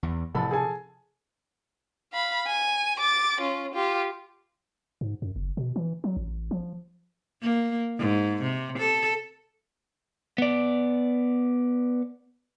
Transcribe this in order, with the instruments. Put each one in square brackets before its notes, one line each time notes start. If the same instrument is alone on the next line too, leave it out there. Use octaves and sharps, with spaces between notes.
[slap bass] E2
[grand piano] A1 A4 B5 [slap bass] C3 F3
[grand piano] G#4 A4 G#5
[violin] F5 B5
G#5
D6 A6
C#4 F4
F4 G4
[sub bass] G#2
F#2
F#1
B2
E3
F#3
A1
F3
[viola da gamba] A#3
G#2
C3
A4
[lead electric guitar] B3 D5